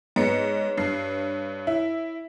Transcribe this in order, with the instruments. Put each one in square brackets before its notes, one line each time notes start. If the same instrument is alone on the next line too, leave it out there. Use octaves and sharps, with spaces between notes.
[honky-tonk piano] G#2 B3 C#7 [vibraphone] C#5
[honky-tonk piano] G2 C7
E4